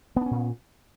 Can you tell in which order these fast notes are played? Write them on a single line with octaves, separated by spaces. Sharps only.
B3 D4 C#4 A#2